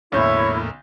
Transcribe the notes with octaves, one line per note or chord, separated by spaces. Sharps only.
B1 E2 A2 D3 A#3 E4 C#5 G6